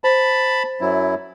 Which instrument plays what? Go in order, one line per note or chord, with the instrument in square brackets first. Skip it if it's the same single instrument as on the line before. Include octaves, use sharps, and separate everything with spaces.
[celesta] C5 [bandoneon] A5 B5
[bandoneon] F#2 F#3 E4